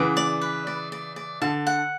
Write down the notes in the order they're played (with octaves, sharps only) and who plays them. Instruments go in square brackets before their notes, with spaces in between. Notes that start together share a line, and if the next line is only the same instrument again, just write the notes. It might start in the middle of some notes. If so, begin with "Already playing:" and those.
Already playing: [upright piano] C#3 E3 [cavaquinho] F#5 D6
[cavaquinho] D5
B4
D5
D5
D5
[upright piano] D3 [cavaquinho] A5
[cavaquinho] F#5